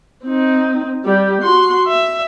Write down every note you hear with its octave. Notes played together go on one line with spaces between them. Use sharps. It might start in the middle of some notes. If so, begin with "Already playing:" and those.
C4 D#4
G3 G4
F#4 C6
E5